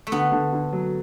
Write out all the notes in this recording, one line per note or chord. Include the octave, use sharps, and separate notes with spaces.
A3
D3 B3
D3
D3
F#3